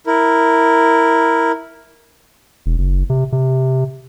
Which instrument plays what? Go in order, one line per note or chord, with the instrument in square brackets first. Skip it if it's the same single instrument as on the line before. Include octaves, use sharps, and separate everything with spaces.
[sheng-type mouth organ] E4 A#4
[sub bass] E1
F#1
C3
C3